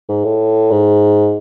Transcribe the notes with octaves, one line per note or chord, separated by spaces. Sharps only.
G#2
A2
G#2